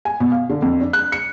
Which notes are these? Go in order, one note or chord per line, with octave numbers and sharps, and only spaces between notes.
G#5
B2
F5
D3
F2
D4
F#6
C#7